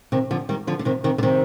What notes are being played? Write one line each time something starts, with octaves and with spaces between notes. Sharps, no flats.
C3 D#3
D3 F3
D#3 G3
D3 F3
D3
C3 D#3
C3 D#3
D3
C3 D#3